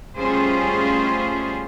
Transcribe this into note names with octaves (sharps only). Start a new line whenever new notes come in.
G3 A3 C#4 F4 G#4 C5